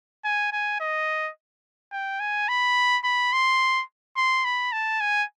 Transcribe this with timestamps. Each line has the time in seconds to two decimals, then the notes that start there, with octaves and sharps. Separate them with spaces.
0.25 G#5
0.53 G#5
0.80 D#5
1.92 G5
2.20 G#5
2.49 B5
3.04 B5
3.33 C6
4.17 C6
4.45 B5
4.73 A5
5.01 G#5